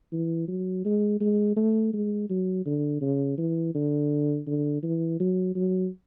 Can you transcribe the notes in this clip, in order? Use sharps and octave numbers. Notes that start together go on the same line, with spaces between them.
E3
F#3
G#3
G#3
A3
G#3
F#3
D3
C#3
E3
D3
D3
E3
F#3
F#3